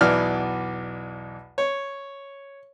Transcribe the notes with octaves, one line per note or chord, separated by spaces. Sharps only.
B1 E2 E3 D5 F6
C#5